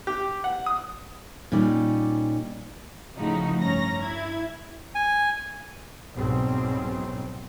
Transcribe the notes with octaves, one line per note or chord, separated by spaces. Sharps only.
G4
F#5
D#6
A#2 G3 C#4 D#4 D5
A2 C#3 F3 D#4 F#4
G2 C#4 A#5 A#6
E4 G#6
G#5
C2 G#2 B2 F#3 G3 C4